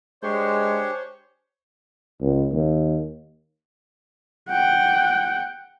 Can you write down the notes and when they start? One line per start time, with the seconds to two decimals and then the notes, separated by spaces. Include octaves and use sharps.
0.23 G#3 D4 G4 G#4 C5 C#5
2.21 C#2
2.52 D#2
4.50 F#5 G5